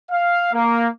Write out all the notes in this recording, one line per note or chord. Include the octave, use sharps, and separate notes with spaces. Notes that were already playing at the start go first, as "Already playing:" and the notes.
F5
A#3